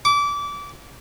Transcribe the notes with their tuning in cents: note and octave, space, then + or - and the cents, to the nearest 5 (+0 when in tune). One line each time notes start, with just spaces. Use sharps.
D6 -25